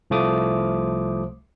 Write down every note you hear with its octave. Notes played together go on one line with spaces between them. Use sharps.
C2 F3 A3 D6 D#6